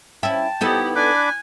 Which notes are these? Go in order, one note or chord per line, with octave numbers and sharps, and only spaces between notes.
C#4 E4 G5 A5
B3 D#4 E4 G4 A4
D4 G#5 B5 D6 F#6